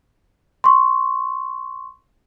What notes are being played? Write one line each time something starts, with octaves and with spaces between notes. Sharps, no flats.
C6 C#6